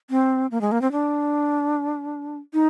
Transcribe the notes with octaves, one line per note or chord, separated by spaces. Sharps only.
C4
A#3
G#3
A#3
C4
D4
D#4